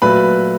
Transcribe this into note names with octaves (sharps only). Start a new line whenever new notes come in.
A#2 F#3 A3 B4 B5